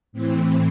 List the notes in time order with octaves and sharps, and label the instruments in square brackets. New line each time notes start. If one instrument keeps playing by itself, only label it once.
[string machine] A2 E3 C4